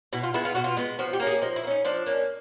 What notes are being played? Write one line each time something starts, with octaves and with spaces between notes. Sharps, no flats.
B2 E4
F4
G#3 B3 E4
F4
B2 F#4
F4
G#3 B3
F3 F#4
G4
A#3 C#4
G#4
F3 D#4
E4
A#3
C#4 D#4
F3 D4
A#3 C#4